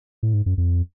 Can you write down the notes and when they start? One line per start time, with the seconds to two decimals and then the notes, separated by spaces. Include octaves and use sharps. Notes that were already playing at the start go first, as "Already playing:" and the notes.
0.23 A2
0.34 G#2
0.46 F#2
0.58 F2